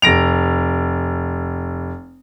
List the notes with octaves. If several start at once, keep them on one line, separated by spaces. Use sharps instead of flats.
F1 A#6 D7 F7